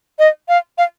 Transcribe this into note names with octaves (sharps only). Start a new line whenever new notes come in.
D#5
F5
F5